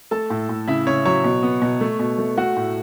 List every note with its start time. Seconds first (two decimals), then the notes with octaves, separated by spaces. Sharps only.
0.11 A3 A4 A5
0.30 A2
0.49 A2
0.68 C#3 E4 E5
0.87 C#3 C#5
1.05 F#3 C#5
1.24 B2
1.43 B3
1.62 B2
1.81 A3
1.99 B2
2.18 A3
2.37 A3 F#4 F#5
2.57 A2